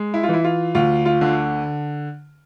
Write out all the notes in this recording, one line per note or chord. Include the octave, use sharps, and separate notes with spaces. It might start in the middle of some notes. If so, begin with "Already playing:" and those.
Already playing: G#3
E4
F4
E3 E4
F4
D2 F4
F4
D3